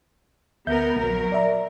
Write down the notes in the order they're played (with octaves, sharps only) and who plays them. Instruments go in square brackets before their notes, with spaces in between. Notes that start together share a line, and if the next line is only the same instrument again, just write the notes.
[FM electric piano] D2 E5 G6 [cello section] B3 A#4
[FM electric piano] A#1 [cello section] F#3 A#4
[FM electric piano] D5 E5 A#5